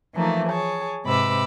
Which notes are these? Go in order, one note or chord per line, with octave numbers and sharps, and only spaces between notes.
E3 F3 A3 A#3 D#4
G#4 C#5 A5
G#2 C3 B4 B5 D6 E6